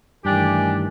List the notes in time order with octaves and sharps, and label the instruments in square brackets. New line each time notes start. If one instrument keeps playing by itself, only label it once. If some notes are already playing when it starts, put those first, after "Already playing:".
[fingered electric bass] G2 [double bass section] D#3 E3 A3 [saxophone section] D4 G4 [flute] G#5